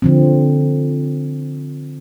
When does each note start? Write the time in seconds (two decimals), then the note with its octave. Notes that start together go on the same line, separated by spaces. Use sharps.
0.02 D3 F3 C4